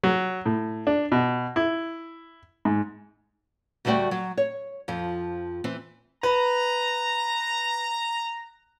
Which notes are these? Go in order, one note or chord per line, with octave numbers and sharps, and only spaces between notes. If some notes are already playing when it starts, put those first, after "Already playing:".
F#3
A2
D4
B2
E4
G#2
D2 G3 A3 F#4 D5 G5
F#3
C#5
F2 F3
E3 C4
B4 A#5